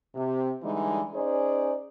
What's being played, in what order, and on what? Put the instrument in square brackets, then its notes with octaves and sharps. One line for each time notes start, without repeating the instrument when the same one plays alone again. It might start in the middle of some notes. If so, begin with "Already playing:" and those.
[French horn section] C3
D3 E3 G3 G#3 D#4
C#4 D#4 G#4 C5 D5